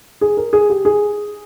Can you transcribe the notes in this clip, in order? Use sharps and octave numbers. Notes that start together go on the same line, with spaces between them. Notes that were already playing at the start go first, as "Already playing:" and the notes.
G#4
A#4
G#4
G4
G#4